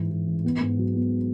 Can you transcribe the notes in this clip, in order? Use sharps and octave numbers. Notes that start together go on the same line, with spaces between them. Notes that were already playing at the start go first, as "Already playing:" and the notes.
Already playing: G#2 E3
E3
A1
B3
G#2
F#3
B3